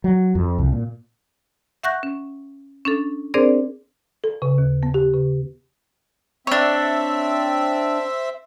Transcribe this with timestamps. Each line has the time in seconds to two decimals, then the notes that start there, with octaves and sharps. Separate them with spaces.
0.04 F#3
0.35 F2
0.59 C2
0.72 A#2
1.83 E5 F#5 C#6 F#6 G6 A#6
2.03 C#4
2.85 C#4 D4 A4
3.34 C4 D4 G#4 A#4 C5 D5
4.24 A4
4.42 C#3
4.58 D#2
4.83 B3
4.94 G4
5.14 C#3
6.47 C4 D4 C#5 E5